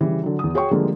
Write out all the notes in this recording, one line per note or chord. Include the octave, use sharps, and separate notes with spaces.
C#3 E3 G3
D3 F#3
E2 D#6
F#4 G#4 C#5 G5 C#6
D3 F3 G3 G#3 A#3